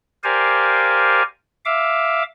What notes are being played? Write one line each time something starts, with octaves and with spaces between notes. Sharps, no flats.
G4 A#4 C5 D5 F5 G#5
E5 F5 D6